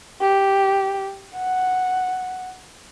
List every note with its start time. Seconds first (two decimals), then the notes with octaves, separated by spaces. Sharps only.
0.21 G4
1.36 F#5